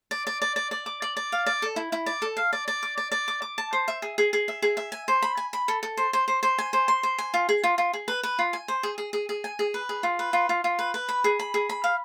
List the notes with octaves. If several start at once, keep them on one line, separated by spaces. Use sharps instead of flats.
D5
D5
D5
D5
D5
D6
D5
D5
F5
D5
A4
E4
E4
D5
A4
F5
D5
D5
D6
D5
D5
D6
D6
A5
C5
E5
G#4
G#4
G#4
E5
G#4
E5
G#5
C5
B5
G#5
B5
A4
A4
C5
C5
C5
C5
G#5
C5
C6
C5
G#5
F4
G#4
F4
F4
G#4
B4
B4
F4
G#5
C5
G#4
G#4
G#4
G#4
G#5
G#4
B4
G#4
F4
B4
F4
F4
F4
B4
B4
B5
G#4
B5
G#4
B5
F5